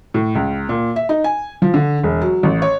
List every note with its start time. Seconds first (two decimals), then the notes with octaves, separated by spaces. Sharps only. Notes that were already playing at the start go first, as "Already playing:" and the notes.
0.14 A2
0.35 C#2
0.69 A#2
0.96 E5
1.09 D#4
1.24 G#5
1.62 F3
1.74 D3
2.03 E1
2.21 F#3
2.43 A1
2.62 C#5